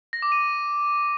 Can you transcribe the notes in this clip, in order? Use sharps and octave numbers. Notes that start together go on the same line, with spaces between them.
A#6
D6
D#7